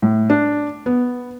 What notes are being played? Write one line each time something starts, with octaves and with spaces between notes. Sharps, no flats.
A2
D4
B3